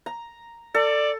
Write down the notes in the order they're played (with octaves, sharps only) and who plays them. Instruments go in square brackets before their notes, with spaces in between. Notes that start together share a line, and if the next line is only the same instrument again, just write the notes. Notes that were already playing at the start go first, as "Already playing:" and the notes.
[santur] A#5
[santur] A4 [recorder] D5